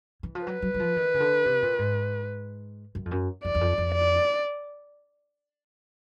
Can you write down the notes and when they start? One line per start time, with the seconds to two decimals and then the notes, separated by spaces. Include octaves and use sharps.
0.23 E3
0.35 F3
0.46 F#3 B4
0.62 F#3
0.74 F#3
0.80 F3
0.96 D#3
1.14 C#3
1.20 D3
1.45 C3
1.62 A#2
1.79 G#2
2.95 F#2
3.05 F2
3.11 F#2
3.45 F2 D5
3.55 E2
3.61 F2
3.78 F2
3.95 D5